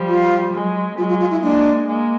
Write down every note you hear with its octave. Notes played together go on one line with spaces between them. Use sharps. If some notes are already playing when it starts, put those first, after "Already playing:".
Already playing: F3 G3
F4
F#3 G#3
F#3 G#3 F4
F4
F4
E4
G#3 A#3 D4
G#3 A#3